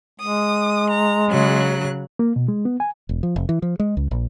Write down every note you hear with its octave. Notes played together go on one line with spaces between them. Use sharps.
G#3 D#6
A#5
C#3 F#3 F#6
A#3
B2
G#3
B3
G#5
E1
F3
F1
E3
F3
G#3
C#2
A#1